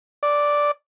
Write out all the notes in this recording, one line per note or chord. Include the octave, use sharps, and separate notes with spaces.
D5